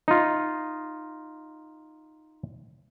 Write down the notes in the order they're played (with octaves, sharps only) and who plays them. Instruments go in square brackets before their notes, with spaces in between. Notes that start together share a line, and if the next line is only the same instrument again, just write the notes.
[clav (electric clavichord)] D#4 F4